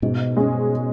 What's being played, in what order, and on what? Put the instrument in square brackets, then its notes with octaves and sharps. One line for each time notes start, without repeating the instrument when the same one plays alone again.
[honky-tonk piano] G#2 [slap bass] B2
[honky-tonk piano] G#3 C#4 G#4